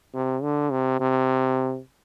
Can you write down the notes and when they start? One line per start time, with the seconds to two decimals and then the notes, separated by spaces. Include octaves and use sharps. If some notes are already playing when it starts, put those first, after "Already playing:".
0.14 C3
0.43 D3
0.71 C3
1.00 C3